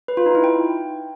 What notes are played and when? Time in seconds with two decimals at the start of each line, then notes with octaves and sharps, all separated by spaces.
0.08 B4
0.17 F4
0.26 D#4
0.35 E4
0.44 G5